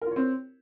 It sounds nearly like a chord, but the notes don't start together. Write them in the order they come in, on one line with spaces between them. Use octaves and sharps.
A#4 F4 C#5 C4